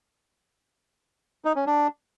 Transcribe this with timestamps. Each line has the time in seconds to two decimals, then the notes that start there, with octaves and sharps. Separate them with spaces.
1.45 D#4
1.56 C#4
1.67 D4